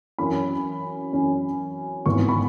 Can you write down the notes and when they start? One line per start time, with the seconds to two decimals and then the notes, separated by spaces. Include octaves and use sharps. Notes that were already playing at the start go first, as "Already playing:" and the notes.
0.19 F#2 E3 C#4 B5
1.13 F#2 E3 C#4
2.06 G#1 G#2 E3 B3 C#6
2.29 B5